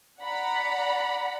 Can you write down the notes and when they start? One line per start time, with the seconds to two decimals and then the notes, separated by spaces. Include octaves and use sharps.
0.22 D5 F#5 A#5 B5